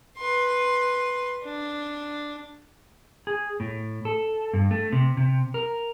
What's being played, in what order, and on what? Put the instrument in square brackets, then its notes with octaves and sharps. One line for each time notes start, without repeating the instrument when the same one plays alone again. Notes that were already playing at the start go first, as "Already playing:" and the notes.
[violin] B4 C6
D4
[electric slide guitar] G#4
A2
A4
G2
A3
C3
C3
A#4